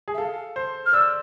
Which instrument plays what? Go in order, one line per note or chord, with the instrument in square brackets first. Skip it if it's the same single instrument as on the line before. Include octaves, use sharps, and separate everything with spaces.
[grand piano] G#4
[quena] E5
[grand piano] A4 [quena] F5
[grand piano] C5
[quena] F6
[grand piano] D5 [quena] E6